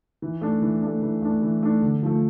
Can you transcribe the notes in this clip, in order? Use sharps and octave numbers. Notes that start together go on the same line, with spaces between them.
E3
A3 D4
E3
A3 D4
E3
A3 D4
E3
A3 D4
D3
F3 A3